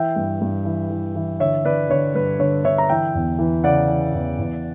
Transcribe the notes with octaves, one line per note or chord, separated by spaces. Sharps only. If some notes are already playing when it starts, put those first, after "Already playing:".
Already playing: E3 E5 G5
G2
G2
E3
E3
E3
D3 C#5 E5
D3 B4 D5
D3 C#5
G2 B4
D3 C#5
D3 C#5 E5
A#5
E3 E5 G5
E2
E3
C#3 D5 F#5
E3
E2
E2